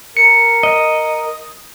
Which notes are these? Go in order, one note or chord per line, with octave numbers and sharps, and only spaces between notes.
A#4 C#7
D#5